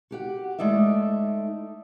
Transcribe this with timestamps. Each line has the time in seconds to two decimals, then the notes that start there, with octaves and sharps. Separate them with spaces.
0.11 F#4 G4 F#5
0.59 G#3 A3 D#4 D5 E5